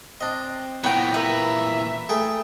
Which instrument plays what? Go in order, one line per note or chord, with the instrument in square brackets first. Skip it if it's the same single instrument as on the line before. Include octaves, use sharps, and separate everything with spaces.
[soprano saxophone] C4 [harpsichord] D4 D#5
[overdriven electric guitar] A#2 E3 [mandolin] B3 G5 [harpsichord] C#5 A#5
[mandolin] A#4 B4 [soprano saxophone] E5
[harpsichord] A3 G#4 [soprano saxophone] G5